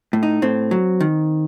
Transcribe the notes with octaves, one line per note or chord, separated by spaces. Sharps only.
A2
D#4
A2 C4
F#3
D#3